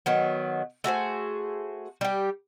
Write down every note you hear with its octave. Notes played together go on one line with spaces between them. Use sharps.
D#3 F#3 B3
A3 F#4 G#4 C5
G3 G4